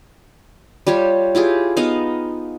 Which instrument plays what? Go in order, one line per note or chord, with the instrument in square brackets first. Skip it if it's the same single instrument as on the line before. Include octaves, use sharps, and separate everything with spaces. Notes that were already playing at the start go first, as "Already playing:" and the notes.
[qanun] G3 F4 G4 C#5
E4 F4 G4 G#4
B3 D#4 D#5 F5